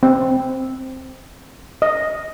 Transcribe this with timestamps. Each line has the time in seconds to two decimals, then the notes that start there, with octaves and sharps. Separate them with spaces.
0.03 C4
1.82 D#5